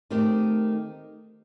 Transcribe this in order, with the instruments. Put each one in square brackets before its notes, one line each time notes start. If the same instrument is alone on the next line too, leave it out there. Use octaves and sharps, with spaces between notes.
[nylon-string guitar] D#3 A3 C4 G4